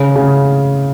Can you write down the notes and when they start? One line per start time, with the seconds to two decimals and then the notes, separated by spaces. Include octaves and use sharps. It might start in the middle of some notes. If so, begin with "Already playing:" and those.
Already playing: C#3
0.15 C#3